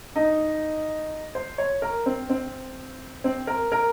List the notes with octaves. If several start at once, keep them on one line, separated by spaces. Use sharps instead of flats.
D#4
C5
C#5
A#4
C4
C4
C4
A#4
A#4